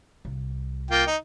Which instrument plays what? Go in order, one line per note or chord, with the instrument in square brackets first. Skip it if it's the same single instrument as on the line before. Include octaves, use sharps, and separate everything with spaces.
[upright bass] C2
[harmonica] A#3 F4 G5
D#4